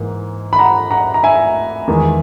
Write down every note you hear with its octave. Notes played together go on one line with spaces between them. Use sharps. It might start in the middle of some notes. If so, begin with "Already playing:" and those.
Already playing: G#2 E3 A#3
B5
F#5 A#5
F#5 A#5
A#5
E5 G#5
E2 D#3 G#3